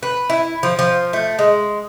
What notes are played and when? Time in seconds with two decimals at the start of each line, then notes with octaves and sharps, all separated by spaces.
0.03 B4
0.30 E4
0.63 F3
0.79 F3
1.13 A3
1.39 G#3